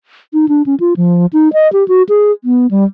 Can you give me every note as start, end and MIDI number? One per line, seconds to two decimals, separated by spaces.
0.33 0.49 63
0.49 0.62 62
0.66 0.75 61
0.80 0.94 65
0.97 1.26 53
1.33 1.52 63
1.53 1.71 75
1.73 1.86 67
1.88 2.03 66
2.09 2.32 68
2.44 2.67 59
2.71 2.84 55